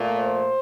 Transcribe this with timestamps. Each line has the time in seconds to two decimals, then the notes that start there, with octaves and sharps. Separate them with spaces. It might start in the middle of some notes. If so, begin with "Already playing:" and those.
Already playing: A#2 A3
0.19 C5